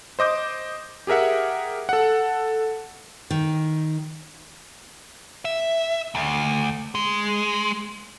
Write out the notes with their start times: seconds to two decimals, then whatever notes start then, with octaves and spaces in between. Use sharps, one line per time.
0.19 C5 D#5 D6 G6
1.07 G4 G#4 A#4 E5 F#5
1.89 A4 F#5
3.30 D#3
5.45 E5
6.15 D2
6.95 G#3